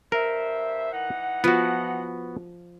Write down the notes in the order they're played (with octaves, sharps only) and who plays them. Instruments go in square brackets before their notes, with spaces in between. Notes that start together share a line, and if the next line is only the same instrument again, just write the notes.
[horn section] G2 C5 E5 [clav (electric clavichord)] A#4
[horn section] E3 D#4 F#5
[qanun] F3 [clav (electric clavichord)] B3 F#4